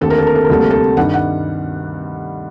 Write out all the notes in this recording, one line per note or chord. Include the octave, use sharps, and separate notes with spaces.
D#2 D3 A3 C4 A4
A#4
A4
A#4
A4
A#4
D2 C3 G3 A#3 A4
A#4
A4
G2 D#3 G3 F#5
F#5